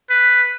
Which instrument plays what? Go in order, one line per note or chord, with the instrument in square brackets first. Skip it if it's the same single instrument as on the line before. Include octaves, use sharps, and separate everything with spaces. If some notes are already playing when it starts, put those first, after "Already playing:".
[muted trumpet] B4